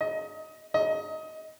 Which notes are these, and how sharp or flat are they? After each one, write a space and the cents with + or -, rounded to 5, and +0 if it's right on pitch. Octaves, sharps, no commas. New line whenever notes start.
D#5 +25
D#5 +25